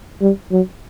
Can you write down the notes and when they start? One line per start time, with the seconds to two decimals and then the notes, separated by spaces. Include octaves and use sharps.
0.21 G3
0.51 F#3